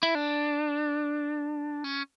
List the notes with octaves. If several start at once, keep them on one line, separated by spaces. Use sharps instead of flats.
E4
D4
C#4